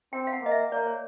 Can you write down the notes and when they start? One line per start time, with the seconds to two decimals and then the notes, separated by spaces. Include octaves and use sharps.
0.13 C4 G5
0.27 F5
0.33 F#5
0.42 A#3 D#5
0.51 E5
0.71 A#3 D5
0.87 C#5